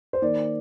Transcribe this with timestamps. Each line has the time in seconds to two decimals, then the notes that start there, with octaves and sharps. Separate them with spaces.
0.13 C5
0.22 D#3 A#3 D5